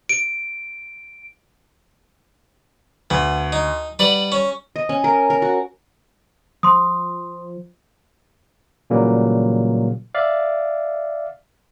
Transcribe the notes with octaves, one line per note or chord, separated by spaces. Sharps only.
D7
D2 B3
D#4
G3 B4 D5 F#5
C#4
D#5
C#4
A#4
A#4
F#4
F3 C6 D#6
A#2 C#3 E3 F#3 G3 A#3
D5 E5 F5